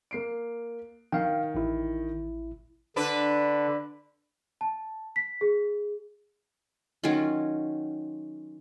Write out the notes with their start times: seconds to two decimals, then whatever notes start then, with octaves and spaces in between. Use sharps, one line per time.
0.11 A#3 C7 D7
1.12 D#3 F5 G5
1.55 A1 E4
2.96 D3 D4 B4
4.61 A5
5.16 B6
5.41 G#4
7.03 D#3 F#3 C#4 F4